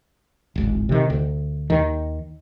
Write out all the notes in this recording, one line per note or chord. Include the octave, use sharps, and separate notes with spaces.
D1 G#1
C3 D#3
D2
D#2 D#3